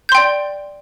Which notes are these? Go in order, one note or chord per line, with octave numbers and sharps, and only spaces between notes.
D5 G5 C6 G6